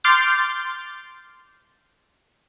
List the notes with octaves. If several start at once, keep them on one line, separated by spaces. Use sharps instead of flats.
C6 D6 F6 G6 A6